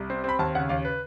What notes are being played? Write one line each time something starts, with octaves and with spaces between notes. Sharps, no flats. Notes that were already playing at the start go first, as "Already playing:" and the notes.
Already playing: C2
C4
C4 B5
D#2 A5
C#3 F#5
D#2 F5
B4